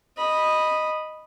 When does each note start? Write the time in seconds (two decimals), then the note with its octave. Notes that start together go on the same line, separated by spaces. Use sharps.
0.17 D#5 B5